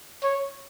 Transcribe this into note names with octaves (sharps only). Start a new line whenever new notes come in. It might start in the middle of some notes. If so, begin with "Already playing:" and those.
C#5